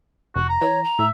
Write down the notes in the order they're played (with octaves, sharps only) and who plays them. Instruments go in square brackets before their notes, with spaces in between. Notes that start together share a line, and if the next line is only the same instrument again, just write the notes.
[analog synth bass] F1 [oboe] F#4
[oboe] A#5
[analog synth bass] E3 [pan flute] C#5
[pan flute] A#5
[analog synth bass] A2 [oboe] E5